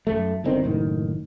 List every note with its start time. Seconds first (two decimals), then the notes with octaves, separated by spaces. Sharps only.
0.07 F#2 A3
0.44 G1 D3 D#3 C4
0.64 F#1 A2 D#3